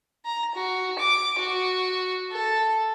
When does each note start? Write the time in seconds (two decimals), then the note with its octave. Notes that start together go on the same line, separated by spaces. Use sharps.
0.25 A#5
0.55 F#4
0.99 D6
1.39 F#4
2.32 A4